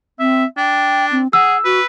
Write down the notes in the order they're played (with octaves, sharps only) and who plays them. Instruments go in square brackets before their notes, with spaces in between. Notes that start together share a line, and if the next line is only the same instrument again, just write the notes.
[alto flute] C4 [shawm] E5
[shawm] D4 [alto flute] G5
[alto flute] C4
[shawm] G#4 [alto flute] F#5 [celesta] E6
[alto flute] F#4 [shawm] B4